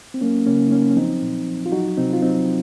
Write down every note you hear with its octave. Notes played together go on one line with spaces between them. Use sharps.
C4
F#3 A#3 C#4
C#3 A#3 C#4
D#4
F#3 A#3 C#4
C#4
F3 C4 D#4
A#2
F3
F4
F#3 D#4 F#4
C3 C4 D#4
F4
F#3 C4 D#4